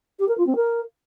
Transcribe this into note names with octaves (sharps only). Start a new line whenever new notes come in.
G4
A#4
F4
C4
A#4